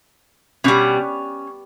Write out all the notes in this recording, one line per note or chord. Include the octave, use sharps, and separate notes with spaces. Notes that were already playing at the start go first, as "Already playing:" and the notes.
B2 G3 C#4